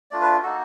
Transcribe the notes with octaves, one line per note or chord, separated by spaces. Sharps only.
A3 D4 F4 D5
B4
A#3 D#4 F#4 A4